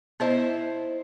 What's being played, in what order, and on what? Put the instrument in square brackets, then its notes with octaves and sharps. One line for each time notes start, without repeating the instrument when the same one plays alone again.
[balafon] B3 D#5 [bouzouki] D#4 E4 C5